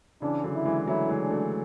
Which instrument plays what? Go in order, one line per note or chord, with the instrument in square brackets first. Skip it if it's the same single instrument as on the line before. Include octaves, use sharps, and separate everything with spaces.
[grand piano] C#3 E3 [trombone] D4
[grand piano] D3 F#3
[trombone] E4
[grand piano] E3 G#3
[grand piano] F#3 A3 [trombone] E4
[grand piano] E3 G#3
[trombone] D4
[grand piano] F#3 A3